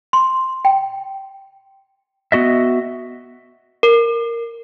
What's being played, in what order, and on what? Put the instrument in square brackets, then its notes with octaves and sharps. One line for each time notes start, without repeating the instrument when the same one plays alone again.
[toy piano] C6
G5
[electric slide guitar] B3 F#4 D#5 E5
[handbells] A#4